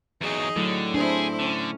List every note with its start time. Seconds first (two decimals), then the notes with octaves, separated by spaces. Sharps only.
0.21 E2 F#3 D#4 G#4 D#5
0.56 A2 D3 F#3
0.94 C4 D4 E4 G#4 C5
1.39 D3 C#4